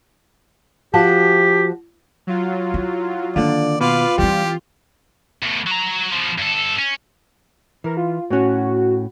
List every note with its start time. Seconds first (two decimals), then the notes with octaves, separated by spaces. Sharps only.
0.94 F3 F#4 G4 A5
2.27 F#3 F4
2.74 E4
3.36 D3 D#3 A#3 F4 D5
3.81 B2 F4 B4 F5 D6
4.18 E3 G3 C4 G4
5.42 E2 A2
5.67 F#3 A#5
6.12 B2 F3
6.38 G2 A4
6.79 C#4
7.84 E3 A#4
7.97 F4
8.30 A2 C#4 F#4